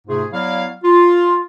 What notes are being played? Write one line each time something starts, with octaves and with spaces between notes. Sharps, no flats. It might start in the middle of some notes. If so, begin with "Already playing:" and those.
G#2 C3 A3 F4 G#4
F#3 B3 E4 D5 F5
F4